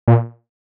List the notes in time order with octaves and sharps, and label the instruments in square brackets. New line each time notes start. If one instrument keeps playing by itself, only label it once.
[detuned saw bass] A#2